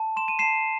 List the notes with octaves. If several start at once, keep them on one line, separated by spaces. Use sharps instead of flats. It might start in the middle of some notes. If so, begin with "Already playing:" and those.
Already playing: A5
C6 E7
D#7
A5 C7 E7